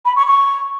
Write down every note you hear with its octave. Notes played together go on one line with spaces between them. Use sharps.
B5
C#6
C#6